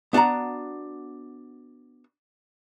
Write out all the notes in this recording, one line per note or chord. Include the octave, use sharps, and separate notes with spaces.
B3 D4 F#4 F#5 A#5